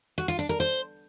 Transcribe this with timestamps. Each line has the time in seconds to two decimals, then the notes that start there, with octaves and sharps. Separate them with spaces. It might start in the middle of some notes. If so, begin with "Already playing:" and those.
0.18 F#4
0.28 F4
0.39 D4
0.49 A#4
0.60 C5